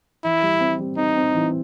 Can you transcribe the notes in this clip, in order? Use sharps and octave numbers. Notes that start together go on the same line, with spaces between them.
E3 E4
G3
C4
G3
C4 D#4
C4
E3